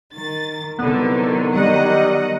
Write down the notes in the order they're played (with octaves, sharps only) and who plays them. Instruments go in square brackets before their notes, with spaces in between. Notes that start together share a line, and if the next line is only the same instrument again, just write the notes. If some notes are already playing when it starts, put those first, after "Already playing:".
[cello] D#3 [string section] A6
[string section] C2 D3 [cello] D#3 F#3 [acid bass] B3
[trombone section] G3 [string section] D#5 F#5